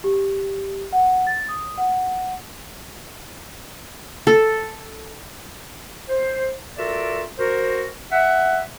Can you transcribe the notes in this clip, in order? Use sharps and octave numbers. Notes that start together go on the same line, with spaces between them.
G4
F#5
A6
D#6
F#5
A4
C5
F4 F#4 A4 A#4 D5 E5
F#4 A#4 C5
E5 F#5